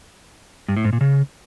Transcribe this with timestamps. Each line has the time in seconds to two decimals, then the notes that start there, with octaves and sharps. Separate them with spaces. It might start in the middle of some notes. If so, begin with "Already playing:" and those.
0.68 G2
0.77 A2
0.85 G#2
0.93 A#2
1.01 C#3